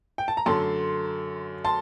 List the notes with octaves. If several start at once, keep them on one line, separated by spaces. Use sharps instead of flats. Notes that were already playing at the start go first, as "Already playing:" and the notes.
G5
A5
A#5
F#2 D3 A3 A5 C6
A5 C6